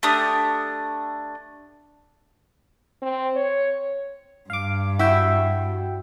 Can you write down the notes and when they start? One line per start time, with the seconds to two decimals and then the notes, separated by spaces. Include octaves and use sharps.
0.03 A3 D4 G4 D#6
3.02 C4
3.36 C#5
4.50 G2 F5 D6
4.99 E4 F#4 E5 G5